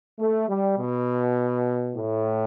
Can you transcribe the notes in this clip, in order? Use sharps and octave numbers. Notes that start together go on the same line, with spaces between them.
A3
G3
B2
A2